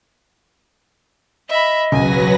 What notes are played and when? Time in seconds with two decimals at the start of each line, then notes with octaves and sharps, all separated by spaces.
1.49 D#5 E5 B5
1.92 E1 C#2 C#3 F#3 B4 G#5 A#6